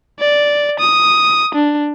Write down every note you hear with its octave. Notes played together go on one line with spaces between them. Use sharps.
D5
D#6
D4